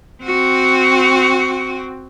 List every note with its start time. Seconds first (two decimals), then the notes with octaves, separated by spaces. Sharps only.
0.23 C4 F#4